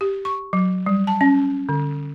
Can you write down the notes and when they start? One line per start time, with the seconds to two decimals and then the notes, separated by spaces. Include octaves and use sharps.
0.01 G4
0.25 C#6
0.53 F#3
0.86 G3
1.07 A5
1.21 C#4
1.69 D3